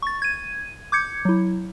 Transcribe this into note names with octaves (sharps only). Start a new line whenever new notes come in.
C#6 A6
G#6 D#7
D6 G6 G#6 C#7
F#3 E4